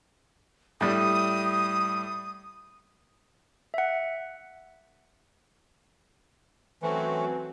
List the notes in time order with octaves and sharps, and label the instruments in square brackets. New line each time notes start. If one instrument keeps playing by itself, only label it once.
[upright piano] A2 G3 [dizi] D#6
[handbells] E5 F#5
[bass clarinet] E3 [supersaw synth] F#3 C4 F#4 [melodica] A3 C#4